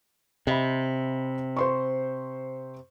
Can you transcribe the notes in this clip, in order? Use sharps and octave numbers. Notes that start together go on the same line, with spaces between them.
C3 D#5 E5 B5
C5 C6 C#6